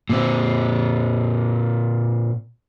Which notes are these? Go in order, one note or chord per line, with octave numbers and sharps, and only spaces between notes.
A#2 C4